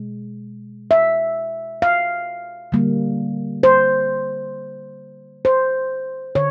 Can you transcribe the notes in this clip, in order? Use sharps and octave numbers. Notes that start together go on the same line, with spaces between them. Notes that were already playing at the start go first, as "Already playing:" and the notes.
Already playing: B2 G#3
E5
F5
D3 G3 A#3
C5
C5
D3 C#5